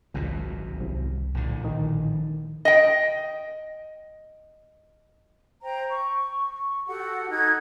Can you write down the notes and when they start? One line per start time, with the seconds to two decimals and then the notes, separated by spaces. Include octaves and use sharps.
0.14 G#1 C#2 F#2 B2
0.81 C2
1.34 A#1 A2 D3
1.64 D#3
2.65 D#5 G5
5.61 C5 G5 A#5
5.90 C#6
6.87 F#4 G4 A4 F#5
7.30 D#4 A4 F#6 G#6